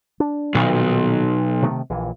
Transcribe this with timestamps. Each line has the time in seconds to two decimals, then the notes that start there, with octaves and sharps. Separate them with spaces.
0.20 D4
0.54 B1 A#2 D#3 F3
1.62 C3 D#3 A3
1.90 A#1 A#2 E3